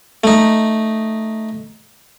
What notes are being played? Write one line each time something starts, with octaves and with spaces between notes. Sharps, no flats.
A3 D#4